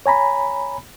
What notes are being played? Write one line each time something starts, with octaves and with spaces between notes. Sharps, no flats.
C#5 G#5 A#5 B5